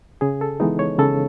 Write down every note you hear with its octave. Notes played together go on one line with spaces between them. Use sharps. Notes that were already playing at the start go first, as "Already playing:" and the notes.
C#3 G#4
A4
E3 G#3 B3 D#4
C#5
C#3 A4